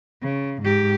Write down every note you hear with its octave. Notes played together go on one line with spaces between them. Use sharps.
C#3
G#2 G4